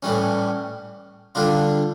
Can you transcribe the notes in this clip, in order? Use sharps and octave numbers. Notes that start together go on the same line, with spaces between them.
A2 E3 G3 C#4
D3 G3 D4 F4